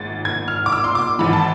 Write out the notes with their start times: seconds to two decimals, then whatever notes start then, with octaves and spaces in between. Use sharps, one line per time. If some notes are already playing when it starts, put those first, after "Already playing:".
Already playing: G#1 G#2 G#6 A6
0.25 G#6
0.48 F6
0.66 D6
0.72 E6
0.84 C6
0.95 D6
1.19 G#1 G#2 E3 B5
1.33 A5